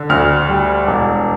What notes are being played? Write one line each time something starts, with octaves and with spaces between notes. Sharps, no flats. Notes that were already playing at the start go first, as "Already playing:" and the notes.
Already playing: D3
D2 F6
G3
E1